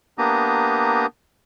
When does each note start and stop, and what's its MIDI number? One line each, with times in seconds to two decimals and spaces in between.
0.18 1.06 58
0.18 1.06 59
0.18 1.06 62
0.18 1.06 67
0.18 1.06 82
0.18 1.06 87